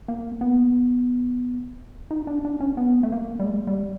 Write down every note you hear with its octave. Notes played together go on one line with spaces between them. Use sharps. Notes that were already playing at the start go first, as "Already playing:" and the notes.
A#3
B3
D#4
D4
D4
C#4
B3
A3
A#3
G3
G#3
G3